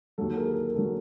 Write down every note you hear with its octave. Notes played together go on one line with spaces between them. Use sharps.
D#2 D3 F#3 A4
G#4 A#4
G#4
A#4
D#2 D3 F#3 A4